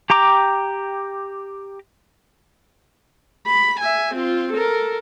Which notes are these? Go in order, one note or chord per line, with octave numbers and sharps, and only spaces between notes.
G4 G5 A#5 D6
B5
E5 G#5
C4 F4
A4 A#4